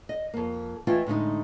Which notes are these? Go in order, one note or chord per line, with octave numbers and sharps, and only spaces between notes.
D#5
F2 A#3
E3 A3 E4 F4 D#5 G5
A2 D3 G#3 D#4